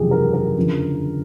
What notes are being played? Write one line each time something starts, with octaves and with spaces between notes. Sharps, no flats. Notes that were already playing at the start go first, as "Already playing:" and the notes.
Already playing: F#1 E2 C3 F3 G#3 G4 G#4
A#4
A#4
G1 F2 C#3 F3